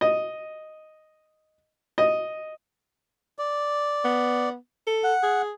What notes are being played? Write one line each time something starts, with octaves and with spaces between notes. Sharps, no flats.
D#5
D#5
D5
B3
A4
F#5
G#4